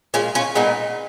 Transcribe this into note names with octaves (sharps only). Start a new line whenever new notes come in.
A#2 G#3 C#4 F4
C#4 F4
A#2 G#3 B3 D#4